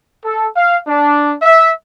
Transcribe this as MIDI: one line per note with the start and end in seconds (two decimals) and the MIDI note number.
0.25 0.47 69
0.56 0.78 77
0.88 1.34 62
1.42 1.71 76